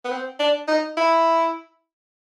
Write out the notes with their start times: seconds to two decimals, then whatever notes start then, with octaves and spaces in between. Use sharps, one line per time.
0.04 B3
0.11 C4
0.39 D4
0.68 D#4
0.97 E4